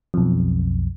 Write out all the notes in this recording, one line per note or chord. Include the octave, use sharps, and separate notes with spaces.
B1 F2